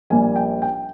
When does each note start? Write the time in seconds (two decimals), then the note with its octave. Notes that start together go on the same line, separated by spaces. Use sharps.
0.10 A#1 A#2 G3 A#3 G#5
0.36 G5
0.62 G5